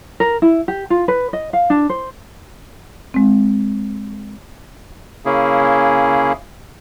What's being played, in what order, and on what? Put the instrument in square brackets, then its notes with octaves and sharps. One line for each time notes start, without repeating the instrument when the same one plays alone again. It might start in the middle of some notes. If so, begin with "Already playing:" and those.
[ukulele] A#4
E4
G4
F4
B4
D#5
F5
D4
C5
[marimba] G#3 C4
[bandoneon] C#3 A#3 C#4 E4 G#4